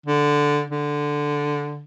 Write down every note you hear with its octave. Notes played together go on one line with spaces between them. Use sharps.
D3
D3